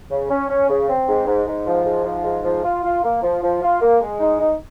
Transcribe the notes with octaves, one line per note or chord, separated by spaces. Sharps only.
C#3
C#4
C#4
C#3
C4
G#2
G#2
G#2
F3
G#2
F3
G#2
F3
F4
F4
A#3
F3
F3
F4
A#3
G#3
D#4
D#4